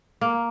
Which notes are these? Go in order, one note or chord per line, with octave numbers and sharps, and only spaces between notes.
A#3